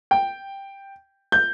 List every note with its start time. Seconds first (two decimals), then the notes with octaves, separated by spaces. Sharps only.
0.11 G5
1.32 G6